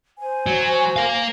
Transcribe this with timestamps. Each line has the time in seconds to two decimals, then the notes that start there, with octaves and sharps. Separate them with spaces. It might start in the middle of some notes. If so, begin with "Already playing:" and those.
0.19 C5 G#5
0.47 F#3
0.96 A#4 F5